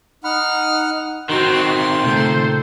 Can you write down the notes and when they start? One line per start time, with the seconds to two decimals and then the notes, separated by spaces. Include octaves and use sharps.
0.24 D#4 F#5 B5 F6
1.29 D#3 C4 D#4 F#4 A#4 C6
2.03 A#2 C#3 A3 A4 C5